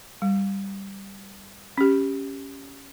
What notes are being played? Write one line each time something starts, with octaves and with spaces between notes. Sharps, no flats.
G3
C#4 G4